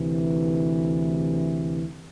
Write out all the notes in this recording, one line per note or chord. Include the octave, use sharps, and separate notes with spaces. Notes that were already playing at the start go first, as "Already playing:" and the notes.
Already playing: D2 C3 E3